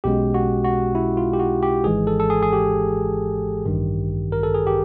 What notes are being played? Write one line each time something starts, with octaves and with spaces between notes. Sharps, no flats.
B1 B2 G#3 C#4 G4
F#4
F#4
E4
F4
G4
F#4
G4
G#1 G#2 E3 G#3 G#4
A4
A4
G#4
G#4
G4
A1 G2 D#3
A#4
A4
G#4
G4